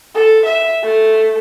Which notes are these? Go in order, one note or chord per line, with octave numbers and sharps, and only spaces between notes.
A4
E5
A3